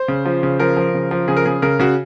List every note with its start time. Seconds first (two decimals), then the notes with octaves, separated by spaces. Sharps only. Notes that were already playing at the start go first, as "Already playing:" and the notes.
Already playing: C5
0.08 C#3
0.25 F3
0.43 C#3
0.59 F3 A#4
0.77 F3
0.94 C#3
1.11 F3
1.28 C#3 G#4
1.37 A#4
1.45 C#3 G#4
1.62 C#3 A#4
1.79 C#3 F#4